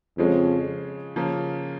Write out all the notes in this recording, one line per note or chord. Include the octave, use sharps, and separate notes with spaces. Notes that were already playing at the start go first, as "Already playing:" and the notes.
F2 C#3 F3 G#3 C#4
C#3 F3 A#3